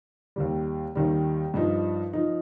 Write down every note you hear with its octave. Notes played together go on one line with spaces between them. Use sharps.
D#2 D#3 G3
D#2 D#3 G3
G2 F3 D#4
F3 D#4